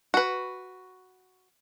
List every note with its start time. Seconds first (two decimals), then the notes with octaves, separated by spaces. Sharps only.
0.14 F#4 B4